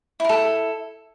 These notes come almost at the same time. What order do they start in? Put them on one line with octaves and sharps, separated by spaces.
E4 A#4 A4